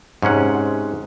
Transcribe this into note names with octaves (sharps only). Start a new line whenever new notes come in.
G#2 C3 C#4 F#5